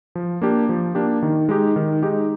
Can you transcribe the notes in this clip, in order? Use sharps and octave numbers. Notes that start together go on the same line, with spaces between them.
F3
A#3 D4 G4
F3
A#3 D4 G4
D#3
G#3 D#4 G4
D#3
G#3 D#4 G4